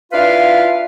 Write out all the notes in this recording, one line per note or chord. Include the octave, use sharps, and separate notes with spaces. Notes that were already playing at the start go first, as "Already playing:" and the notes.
D4 E4 F4 B4 F5